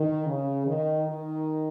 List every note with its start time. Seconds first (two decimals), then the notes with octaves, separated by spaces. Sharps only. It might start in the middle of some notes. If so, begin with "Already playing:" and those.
Already playing: D#3
0.26 C#3
0.66 D#3
1.08 D#3